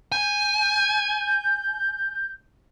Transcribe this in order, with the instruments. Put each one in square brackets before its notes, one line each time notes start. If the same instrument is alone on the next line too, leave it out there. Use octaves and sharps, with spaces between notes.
[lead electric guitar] G#5 [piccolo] G6